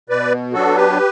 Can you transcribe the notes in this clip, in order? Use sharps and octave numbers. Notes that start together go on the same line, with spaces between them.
B2 B4 D5
F#3 B3 D4 F#4 A4
G4 B4